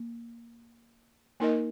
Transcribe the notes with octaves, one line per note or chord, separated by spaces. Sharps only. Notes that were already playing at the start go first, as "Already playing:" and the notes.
Already playing: A#3
A#3 D#4 A#4 D#5